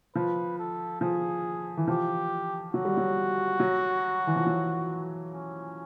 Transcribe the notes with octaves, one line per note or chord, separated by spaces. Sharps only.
F3 B4
A4
F3 G#4
E3
F3 G4
F#3 F#4
G3
F#3
F#3
E3
F3
F#3
C#4